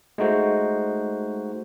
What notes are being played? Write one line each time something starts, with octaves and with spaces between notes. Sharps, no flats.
G#3 A3 D#4 F#4 C5